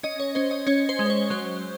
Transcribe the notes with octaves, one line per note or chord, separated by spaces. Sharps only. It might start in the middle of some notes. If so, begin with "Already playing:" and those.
C#4 D#5
C#5
C#4 C5
D#5
C#4 C#5
C5
G#3
C5
C#5
F#3 C5